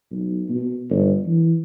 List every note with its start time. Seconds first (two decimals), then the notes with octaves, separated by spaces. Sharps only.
0.11 B1
0.49 B2
0.90 G1
1.26 E3